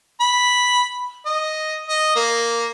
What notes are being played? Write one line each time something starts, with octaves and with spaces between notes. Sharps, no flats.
B5
D#5
D#5
A#3